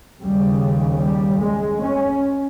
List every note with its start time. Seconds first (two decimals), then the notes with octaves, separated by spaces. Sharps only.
0.22 D#2 C#3 G3
1.01 G3
1.41 G#3
1.81 C#4